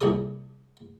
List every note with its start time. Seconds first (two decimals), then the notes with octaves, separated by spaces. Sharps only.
0.01 C2 A#2 G#4 A4 D#6